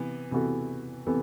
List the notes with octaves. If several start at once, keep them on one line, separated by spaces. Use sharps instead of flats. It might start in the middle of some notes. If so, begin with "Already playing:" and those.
Already playing: C3 E3 B3
C3 E3 B3 F#4 A4
C3 E3 B3 A4